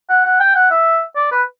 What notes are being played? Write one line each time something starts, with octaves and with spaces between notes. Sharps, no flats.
F#5
F#5
G5
F#5
E5
D5
B4